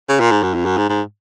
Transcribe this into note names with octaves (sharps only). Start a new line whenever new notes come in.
C#3
A#2
G#2
F#2
F2
F#2
G#2
G#2